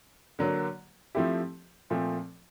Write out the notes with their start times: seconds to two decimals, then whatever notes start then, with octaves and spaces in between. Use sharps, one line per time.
0.39 D3 F#3 A#3
1.15 F3 A3 C4 E4 G4
1.90 A#2 F3 A3 C4